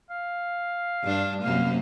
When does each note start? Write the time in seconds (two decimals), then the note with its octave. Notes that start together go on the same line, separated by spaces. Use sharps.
0.10 F5
1.03 G2 D4
1.43 F#2 C3 A#3 F5